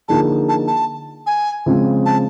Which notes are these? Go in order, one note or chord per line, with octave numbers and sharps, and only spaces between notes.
D3 F3 A#3 D#4 G#4 A5
A5
A5
G#5
C#3 F3 G#3 C4
A5